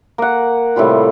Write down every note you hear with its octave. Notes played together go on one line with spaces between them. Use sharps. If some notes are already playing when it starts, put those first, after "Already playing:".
A#3 F#5
A2 C3 G3 F4